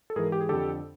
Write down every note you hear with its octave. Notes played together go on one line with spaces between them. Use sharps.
A4
G#2 E3 G#4 A#4
G4
G#4
F2 D3 G4 A4